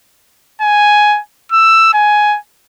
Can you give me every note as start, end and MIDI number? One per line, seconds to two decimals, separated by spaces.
0.62 1.20 80
1.52 1.93 88
1.94 2.37 80